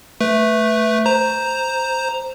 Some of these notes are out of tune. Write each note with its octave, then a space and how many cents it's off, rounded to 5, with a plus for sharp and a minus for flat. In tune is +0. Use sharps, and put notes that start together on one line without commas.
A3 +0 B4 +0
C5 +0 A#5 +0